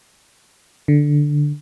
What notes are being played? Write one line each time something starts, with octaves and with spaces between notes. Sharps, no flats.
D3